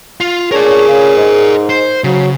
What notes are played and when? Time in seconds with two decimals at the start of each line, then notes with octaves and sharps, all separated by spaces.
0.20 F4
0.51 D4 G#4 A#4 C#5 D5
0.88 C#3
1.17 G#2
1.69 C5
2.04 C#3 F#3